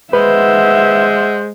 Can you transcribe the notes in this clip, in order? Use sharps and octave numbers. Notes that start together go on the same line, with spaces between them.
G#3 B4 C5 E5 F#5